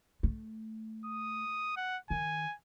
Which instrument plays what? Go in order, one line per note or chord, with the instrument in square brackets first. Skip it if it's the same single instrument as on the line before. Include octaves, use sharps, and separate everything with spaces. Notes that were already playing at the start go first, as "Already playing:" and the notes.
[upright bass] A3
[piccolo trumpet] D#6
F#5
[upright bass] D#3 [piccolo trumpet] G#5